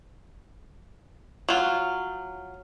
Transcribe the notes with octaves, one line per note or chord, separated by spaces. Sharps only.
F#3 F4